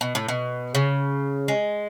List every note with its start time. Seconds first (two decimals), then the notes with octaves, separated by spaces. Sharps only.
0.01 B2
0.15 A2
0.28 B2
0.75 C#3
1.48 G#3